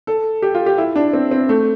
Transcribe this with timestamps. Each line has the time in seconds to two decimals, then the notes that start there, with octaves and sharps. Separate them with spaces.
0.07 A4
0.42 G4
0.55 F4
0.66 G4
0.78 E4
0.96 D4
1.13 C4
1.31 C4
1.49 A3